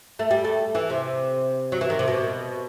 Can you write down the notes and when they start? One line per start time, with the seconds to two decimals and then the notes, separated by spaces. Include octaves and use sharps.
0.19 A3
0.31 G3
0.45 A3
0.75 E3
0.90 C3
1.72 F#3
1.81 E3
1.90 D#3
1.99 C3
2.08 B2